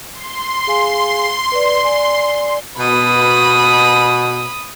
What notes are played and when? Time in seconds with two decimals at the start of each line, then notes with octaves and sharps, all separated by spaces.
0.12 C6
0.67 G#4 F5 G#5
1.52 B4 D5
1.84 D5 G#5
2.78 B2 B5 D#6